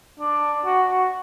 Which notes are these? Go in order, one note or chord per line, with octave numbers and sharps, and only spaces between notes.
D4
F#4
F#4